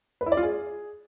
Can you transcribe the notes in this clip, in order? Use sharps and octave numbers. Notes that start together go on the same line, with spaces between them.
B4
E4
D5
F4
G#4